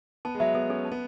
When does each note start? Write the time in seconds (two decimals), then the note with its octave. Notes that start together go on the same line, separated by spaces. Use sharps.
0.25 B3 A5
0.35 G#3
0.40 F#3 E5
0.54 B3 A4
0.70 C#4 A4
0.85 A5
0.92 B3